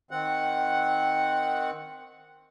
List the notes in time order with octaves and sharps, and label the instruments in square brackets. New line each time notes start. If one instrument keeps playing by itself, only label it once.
[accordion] D#3 C4 F#5